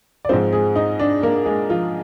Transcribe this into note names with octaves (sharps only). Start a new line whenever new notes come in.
D5
G#2 F3 G#3 C4 C5
G#3 G#4
D#4 D#5
D4 D5
A#3 A#4
G#3 G#4
F3 F4